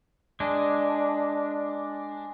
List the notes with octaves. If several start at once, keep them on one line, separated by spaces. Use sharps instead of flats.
G#3 D4